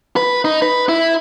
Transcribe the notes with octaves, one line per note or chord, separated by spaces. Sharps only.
B4
D#4
B4
E4